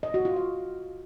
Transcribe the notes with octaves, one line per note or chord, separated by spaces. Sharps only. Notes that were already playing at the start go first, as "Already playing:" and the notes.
D#5
F#4
F4
F5